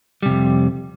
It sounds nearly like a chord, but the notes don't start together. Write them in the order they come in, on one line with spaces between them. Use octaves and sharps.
G3 C3 F2